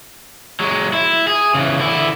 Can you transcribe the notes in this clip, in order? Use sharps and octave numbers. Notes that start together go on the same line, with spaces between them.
F#3 G#3
E4
G#4
C#3 E3
D3 E4